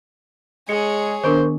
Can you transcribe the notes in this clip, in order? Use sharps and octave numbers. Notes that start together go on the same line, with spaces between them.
G#3 G#4 C#5 C#7
D#3 B3 D4 A#4 C5 C#6